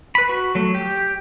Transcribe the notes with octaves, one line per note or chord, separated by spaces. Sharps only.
B4 B5
F#4
F#3 A3
G4